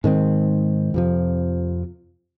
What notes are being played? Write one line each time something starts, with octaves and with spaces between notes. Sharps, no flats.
G#2 D#3 G#3 C4
F2 C3 F3